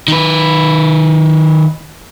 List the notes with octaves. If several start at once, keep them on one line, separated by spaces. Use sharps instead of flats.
D#3 B4